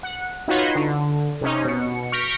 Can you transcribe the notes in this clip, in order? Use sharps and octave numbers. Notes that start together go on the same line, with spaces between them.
F#5
D#4 F4 F#4 B4 C#5 C6
D3
C3 C#4 D#4
B2 C#7
C#6 F6 G6 A#6 B6 D7